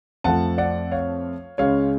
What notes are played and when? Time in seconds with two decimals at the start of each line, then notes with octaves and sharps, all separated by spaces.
0.24 F2 F3 A3 F#5 A5
0.58 D5 F#5
0.91 C#5 F5
1.58 C#2 C#3 G#3 C#5 F5